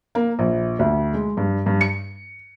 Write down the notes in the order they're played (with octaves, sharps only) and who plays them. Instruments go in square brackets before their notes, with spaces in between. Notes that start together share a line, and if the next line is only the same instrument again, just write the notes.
[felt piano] A#3
A#1
D2
G#3
G2
G2
C#7